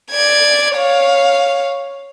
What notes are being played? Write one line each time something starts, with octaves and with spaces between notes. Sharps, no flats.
D5 G#6
C#5 F5